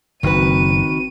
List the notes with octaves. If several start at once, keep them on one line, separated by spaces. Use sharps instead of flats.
F#1 D#3 C4 F#4 B4 C#6 D#7